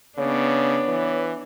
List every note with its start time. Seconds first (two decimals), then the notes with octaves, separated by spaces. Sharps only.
0.18 C#3 B3 D4 C#5
0.89 E3